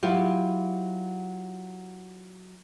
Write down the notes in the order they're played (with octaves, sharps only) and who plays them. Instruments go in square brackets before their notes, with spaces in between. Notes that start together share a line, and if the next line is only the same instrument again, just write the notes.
[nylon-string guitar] F#3 E4 F4 G4